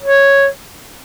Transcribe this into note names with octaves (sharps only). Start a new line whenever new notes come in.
C#5